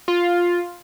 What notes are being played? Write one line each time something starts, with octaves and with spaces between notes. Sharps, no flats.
F4